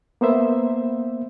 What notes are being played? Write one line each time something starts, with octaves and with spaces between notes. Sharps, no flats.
A#3 B3 C5 E5